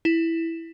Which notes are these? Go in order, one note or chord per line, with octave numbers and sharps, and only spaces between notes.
E4